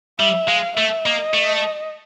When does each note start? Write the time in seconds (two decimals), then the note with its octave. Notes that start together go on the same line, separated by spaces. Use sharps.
0.19 G3 E5
0.48 G#3 F5
0.77 A3 E5
1.05 A#3 D#5
1.34 A3